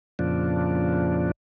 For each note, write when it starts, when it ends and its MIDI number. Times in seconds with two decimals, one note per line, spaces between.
0.19 1.31 41
0.19 1.31 46
0.19 1.31 49
0.19 1.31 53
0.19 1.31 62